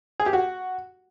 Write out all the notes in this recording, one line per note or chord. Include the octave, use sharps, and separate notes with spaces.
G#4
G4
F#4